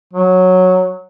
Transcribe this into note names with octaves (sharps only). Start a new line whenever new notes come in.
F#3